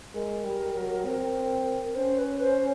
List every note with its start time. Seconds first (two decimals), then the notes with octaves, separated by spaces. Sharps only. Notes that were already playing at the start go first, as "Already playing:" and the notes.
0.14 G#3 A#4
0.44 G3
0.75 F#3
1.05 C4
1.95 C#4 C5
2.18 B4
2.41 C5